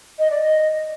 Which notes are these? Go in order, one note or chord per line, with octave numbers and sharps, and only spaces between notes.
D#5
D5
D#5